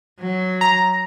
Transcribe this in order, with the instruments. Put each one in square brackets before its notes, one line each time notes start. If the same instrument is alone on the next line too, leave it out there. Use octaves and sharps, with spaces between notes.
[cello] F#3
[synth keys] A#5